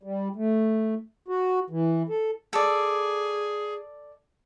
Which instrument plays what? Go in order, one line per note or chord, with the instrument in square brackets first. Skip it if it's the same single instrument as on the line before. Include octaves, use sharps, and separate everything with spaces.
[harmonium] G3
A3
F#4
E3
A4
[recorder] G#4 [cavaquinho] A4 D5